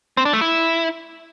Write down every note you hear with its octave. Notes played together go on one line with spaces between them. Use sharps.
C4
D4
A3
E4